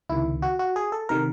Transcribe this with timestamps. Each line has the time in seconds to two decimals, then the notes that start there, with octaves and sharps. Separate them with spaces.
0.09 C#2 C3 D#3 E4
0.42 F#4
0.59 F#4
0.76 G#4
0.92 A4
1.09 C3 D#3 A#4